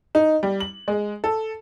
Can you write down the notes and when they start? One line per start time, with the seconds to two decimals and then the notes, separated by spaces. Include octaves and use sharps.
0.15 D#4
0.43 G3
0.60 F#7
0.88 G#3
1.24 A4